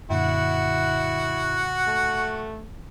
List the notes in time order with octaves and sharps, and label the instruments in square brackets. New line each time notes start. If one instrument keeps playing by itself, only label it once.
[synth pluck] F#2 A#2 D3 [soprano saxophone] E4 [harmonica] F#4 [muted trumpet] F#5
[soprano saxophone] A3